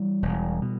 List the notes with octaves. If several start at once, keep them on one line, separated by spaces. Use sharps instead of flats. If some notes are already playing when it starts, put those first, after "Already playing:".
Already playing: E3 G3
E1
B2